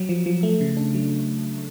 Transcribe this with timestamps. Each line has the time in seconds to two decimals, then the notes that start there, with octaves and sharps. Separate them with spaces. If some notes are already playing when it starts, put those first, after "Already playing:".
Already playing: F#3
0.09 F3
0.26 F3
0.43 A3
0.61 C#3
0.77 D4
0.94 F#3